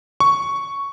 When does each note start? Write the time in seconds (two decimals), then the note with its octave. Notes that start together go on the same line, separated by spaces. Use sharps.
0.20 C#6